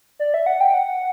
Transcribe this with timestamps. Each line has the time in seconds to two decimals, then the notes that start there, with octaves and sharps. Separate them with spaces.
0.19 D5
0.34 E5
0.46 F#5
0.61 G5
0.74 F#5